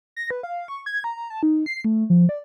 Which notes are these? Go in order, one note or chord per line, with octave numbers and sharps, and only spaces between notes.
A#6
B4
F5
C#6
G#6
A#5
A5
D#4
C7
A3
F3
D5